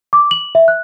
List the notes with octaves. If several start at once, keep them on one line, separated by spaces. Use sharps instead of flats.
D6
F#7
E5
F#6